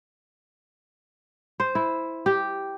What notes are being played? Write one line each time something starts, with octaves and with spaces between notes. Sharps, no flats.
C5
E4
G4